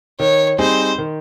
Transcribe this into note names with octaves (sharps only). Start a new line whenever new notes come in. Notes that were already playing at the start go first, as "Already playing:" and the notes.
D#3 C#5
G3 C4 D#4 G#4 C5
D#3